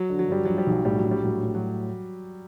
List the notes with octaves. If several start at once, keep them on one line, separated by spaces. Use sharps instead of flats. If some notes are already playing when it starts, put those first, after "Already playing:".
Already playing: F#3
D3
F#3
G2 G3
F3 F#3
G3
B1
F#3
A2 G3
F#3
A#1
G3
A2 F#3
A2
F#3